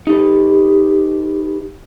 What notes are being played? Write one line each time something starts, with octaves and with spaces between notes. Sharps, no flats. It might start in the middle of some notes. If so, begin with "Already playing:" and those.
D#4 G4 A4 B4